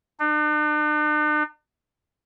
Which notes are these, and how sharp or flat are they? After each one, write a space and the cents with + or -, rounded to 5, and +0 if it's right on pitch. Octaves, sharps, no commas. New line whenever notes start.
D4 +45